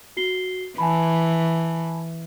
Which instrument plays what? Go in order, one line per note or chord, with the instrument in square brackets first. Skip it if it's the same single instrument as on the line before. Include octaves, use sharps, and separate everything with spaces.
[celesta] F#4 C7 G7
[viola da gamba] E3 [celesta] G#5 A5 B5